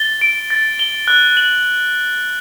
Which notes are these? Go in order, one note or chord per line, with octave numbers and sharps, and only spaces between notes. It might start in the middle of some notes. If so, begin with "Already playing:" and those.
Already playing: A6 G7
D7
A6
G7
F#6
F#7